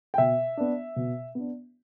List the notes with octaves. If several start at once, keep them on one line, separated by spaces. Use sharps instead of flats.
G5
B2 E5
B3 D4
B2
B3 D4